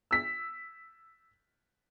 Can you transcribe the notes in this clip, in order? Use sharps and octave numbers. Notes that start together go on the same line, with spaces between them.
E6 B6